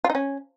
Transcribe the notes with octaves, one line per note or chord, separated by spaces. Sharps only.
F4
D#4
C#4